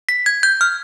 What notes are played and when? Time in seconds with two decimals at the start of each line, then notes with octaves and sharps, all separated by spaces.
0.09 B6
0.26 G#6
0.43 G6
0.61 F6